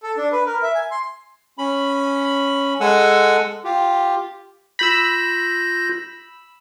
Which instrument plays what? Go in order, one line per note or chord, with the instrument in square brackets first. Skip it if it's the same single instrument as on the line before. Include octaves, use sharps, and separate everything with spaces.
[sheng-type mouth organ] A4
D4
B4
A#4
E5
G#5
C6
[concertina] C#4 B5
G#3 A4 F#5 G#5 E6
F4 G4
[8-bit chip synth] F4 G6 A#6 [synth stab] B5 E6